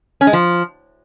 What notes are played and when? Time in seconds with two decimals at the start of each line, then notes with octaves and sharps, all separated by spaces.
0.21 C#4
0.27 G#3
0.33 F3